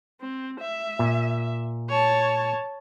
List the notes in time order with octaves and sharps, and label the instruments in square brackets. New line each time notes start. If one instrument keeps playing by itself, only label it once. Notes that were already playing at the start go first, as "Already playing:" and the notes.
[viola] C4
E5
[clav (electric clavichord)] A#2
[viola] C#5 A5